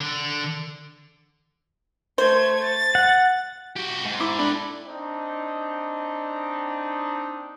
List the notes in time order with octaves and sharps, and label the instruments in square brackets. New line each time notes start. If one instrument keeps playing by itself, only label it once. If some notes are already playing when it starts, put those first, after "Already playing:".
[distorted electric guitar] D3
[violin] A3 G#6 [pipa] C5
[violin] A6
[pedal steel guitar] F#5
[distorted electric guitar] F#4 G4
G#2
[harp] E4 D6
[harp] D4 [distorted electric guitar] A4 B5
[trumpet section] C4 D4 D#4